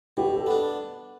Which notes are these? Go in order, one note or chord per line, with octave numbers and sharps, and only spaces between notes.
B2 G4
A4
B3 D4